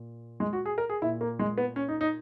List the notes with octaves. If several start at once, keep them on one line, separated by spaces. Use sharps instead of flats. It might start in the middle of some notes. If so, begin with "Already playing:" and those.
Already playing: A#2
G#3
F#4
G#4
A#4
G#4
A#2 E4
A#3
G#3
B3
C#4
D#4
D#4